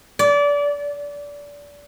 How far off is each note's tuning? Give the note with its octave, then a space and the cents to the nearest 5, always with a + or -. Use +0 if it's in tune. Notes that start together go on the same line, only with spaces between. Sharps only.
D5 -25